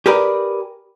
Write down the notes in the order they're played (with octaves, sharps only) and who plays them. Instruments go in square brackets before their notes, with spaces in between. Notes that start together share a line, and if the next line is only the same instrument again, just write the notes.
[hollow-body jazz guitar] G4 G#4 A#4 B4 D5